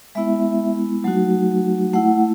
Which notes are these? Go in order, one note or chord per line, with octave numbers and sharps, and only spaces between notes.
G#3 B3 E4 E5
F#3 A3 D#4 F#4
A3 E4 F#5